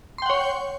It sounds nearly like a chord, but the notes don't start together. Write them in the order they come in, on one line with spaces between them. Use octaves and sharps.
C6 G5 F#5 C#5